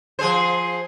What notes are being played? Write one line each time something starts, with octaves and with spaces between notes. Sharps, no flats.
F3 G#4 C5